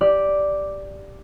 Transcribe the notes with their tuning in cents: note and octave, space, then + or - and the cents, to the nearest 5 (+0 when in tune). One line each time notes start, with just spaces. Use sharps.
G4 +0 D5 +0 D6 +0